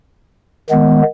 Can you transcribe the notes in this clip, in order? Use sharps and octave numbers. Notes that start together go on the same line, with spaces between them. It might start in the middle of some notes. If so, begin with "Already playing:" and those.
D#3 G#3 B3